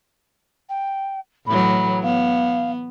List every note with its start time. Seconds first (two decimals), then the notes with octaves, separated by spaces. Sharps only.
0.69 G5
1.47 A2 E3 F#3 B5
2.03 B3 F5